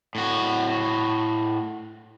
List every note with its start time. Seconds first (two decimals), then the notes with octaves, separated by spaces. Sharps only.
0.15 A2 F#4